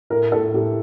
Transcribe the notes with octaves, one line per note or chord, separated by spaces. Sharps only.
A2 A#4
A2 A4
A2 G4